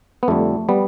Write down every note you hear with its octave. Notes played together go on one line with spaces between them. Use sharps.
B3
F2 D3 G3 A3
G3 B3